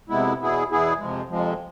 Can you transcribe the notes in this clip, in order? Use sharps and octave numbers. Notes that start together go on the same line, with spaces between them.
F2 C3 G#3 B3 E4
E2 B2 B3 E4 G#4
E2 B2 B3 E4 G#4
F2 C3 F3 G#3
F2 C3 F3 G#3